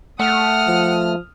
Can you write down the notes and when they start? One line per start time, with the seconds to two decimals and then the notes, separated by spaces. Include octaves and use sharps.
0.19 A3 F#5 D#6 F6
0.67 F3